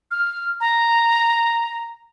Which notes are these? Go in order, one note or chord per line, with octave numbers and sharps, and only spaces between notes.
F6
A#5